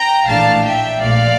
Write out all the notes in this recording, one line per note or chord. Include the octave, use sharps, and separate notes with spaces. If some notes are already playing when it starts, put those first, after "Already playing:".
Already playing: G5 A#5
A#1 A2 E3 A3 D4 F5 A5
E5 G5
A#1 A#2 A3 D5 F5